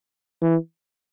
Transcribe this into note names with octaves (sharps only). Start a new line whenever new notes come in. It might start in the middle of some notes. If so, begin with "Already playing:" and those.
E3